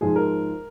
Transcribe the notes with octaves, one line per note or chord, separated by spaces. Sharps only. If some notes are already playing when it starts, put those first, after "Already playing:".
G#2 F3 G#3 G#4
A#4